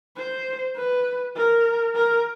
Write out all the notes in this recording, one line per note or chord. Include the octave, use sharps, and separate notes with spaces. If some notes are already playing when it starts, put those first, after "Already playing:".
C5
B4
A#4
A#4